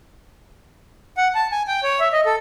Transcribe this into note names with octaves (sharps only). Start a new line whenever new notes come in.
F#5
A5
G#5
G5
C#5
E5
D#5
A4